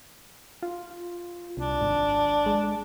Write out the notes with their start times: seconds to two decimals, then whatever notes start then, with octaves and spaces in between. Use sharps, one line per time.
0.63 F4
1.57 C2 D4
1.81 G#1
2.46 G#3